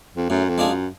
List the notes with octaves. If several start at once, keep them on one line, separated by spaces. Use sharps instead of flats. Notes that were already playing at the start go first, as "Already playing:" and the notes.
F2
F#2 A2
F2
G#3 D4 F4 G#4
F#2